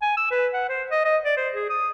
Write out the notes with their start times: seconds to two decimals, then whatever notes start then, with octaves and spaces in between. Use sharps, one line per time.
0.02 G#5
0.17 E6
0.31 B4
0.53 F#5
0.69 C5
0.91 D#5
1.05 D#5
1.25 D5
1.37 C5
1.54 G#4
1.69 D#6